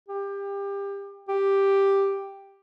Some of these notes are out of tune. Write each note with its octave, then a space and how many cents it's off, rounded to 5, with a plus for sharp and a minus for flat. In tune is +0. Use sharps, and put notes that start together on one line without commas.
G4 +25
G4 +5